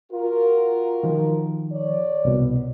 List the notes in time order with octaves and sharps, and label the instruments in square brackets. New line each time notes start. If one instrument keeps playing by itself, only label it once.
[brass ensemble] F4 F#4 A#4
[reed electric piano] D#3 F3
[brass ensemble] C#5 D5
[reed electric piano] C2 B2